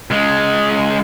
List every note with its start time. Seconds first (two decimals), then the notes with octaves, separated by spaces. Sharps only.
0.11 C#2 G#3